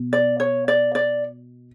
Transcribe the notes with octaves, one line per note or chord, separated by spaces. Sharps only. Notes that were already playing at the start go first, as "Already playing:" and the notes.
Already playing: B2
D5
C#5
D5
D5